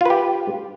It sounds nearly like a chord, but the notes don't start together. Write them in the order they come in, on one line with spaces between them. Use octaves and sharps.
F4 B4 G4